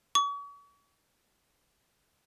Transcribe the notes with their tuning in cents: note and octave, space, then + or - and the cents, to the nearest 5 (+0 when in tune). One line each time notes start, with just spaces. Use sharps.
C#6 +40